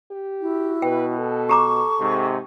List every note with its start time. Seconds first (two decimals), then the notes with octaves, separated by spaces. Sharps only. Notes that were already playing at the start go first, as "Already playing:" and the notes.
0.11 G4
0.41 E4 F#4
0.82 B2 B4 G5
1.19 A4
1.49 G4 A#5 C#6 D6
1.99 G#2 C3